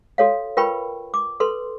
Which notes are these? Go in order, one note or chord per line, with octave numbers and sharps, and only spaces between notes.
F#4 A4 C#5 F5
F4 A#4 B4 G5 B5 C#6
D6
A4 B4 C6